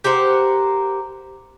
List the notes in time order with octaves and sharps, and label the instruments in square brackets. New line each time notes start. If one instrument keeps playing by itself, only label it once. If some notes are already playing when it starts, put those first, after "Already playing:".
[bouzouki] G4 A#4 C5 F#5